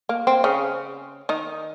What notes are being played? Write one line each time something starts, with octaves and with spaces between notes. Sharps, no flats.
A#3
C4
C#3 C#4
D#3 D#4